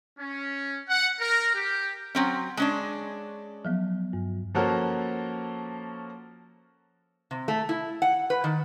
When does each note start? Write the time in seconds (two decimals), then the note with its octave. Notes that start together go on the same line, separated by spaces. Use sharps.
0.18 C#4
0.90 F#5
1.21 A#4
1.55 G4
2.15 F#3 C4 C#4
2.57 G#3 C#4 D4
3.65 F3 F#3 B3
4.13 G2
4.55 F3 A#3 C#4 F#4 A4 A#4
7.31 C3
7.48 A3
7.69 E4
8.02 F#5
8.30 B4
8.44 D#3